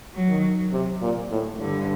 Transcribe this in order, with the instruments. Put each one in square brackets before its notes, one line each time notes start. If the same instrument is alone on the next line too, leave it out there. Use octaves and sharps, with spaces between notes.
[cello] F#3
[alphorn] D#3
C3
A#2
A2
[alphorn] G2 [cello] D3